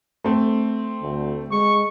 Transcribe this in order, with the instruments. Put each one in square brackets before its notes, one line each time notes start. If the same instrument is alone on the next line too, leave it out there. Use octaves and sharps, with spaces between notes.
[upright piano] A3 C4
[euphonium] D2
[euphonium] G#3 [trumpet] C#6